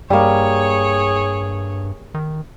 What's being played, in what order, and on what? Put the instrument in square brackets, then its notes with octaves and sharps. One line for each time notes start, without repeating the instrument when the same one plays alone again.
[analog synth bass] G2 [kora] G3 A#3 [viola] G#4 C#5
[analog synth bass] D#3